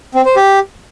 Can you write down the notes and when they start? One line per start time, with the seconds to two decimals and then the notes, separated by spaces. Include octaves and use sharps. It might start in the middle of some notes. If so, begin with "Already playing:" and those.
0.15 C4
0.25 C5
0.36 G4